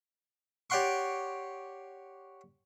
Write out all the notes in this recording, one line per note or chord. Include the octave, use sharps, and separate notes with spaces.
G4 C#5 D5 F#5 C6 C#6